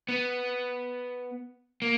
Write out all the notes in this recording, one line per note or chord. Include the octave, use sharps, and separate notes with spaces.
B3
A#3